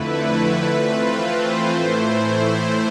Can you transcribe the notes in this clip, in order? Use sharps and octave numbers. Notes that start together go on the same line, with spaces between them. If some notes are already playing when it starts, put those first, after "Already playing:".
Already playing: F2 D3 A3 E4 B4
E3 A3 C4 F4
C5
A2 E3 A3 E4